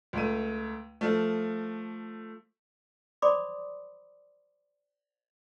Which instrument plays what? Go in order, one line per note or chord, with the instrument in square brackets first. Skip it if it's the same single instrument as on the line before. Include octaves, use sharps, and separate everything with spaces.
[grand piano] C#2 A3 D#7
F3 A3
[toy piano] C5 D5 B5 C6 D6 D#6